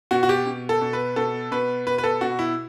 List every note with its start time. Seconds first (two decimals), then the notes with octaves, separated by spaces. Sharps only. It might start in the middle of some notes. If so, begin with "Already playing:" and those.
0.11 B2 F#4
0.23 F#4
0.29 G4
0.46 B2
0.69 A4
0.81 B2
0.93 B4
1.16 B2 A4
1.51 B2 B4
1.87 B2 B4
1.98 B4
2.04 A4
2.21 B2 F#4
2.39 E4